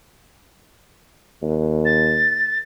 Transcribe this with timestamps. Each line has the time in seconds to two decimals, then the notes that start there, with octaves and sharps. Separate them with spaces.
1.42 D#2
1.85 A6